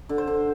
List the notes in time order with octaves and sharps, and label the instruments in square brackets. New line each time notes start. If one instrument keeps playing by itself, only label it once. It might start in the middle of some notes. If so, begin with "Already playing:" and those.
[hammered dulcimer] D3
C5
D3